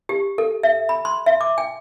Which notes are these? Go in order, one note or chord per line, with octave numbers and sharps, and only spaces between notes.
G4
A4
E5
B5
C6
E5
D6
G5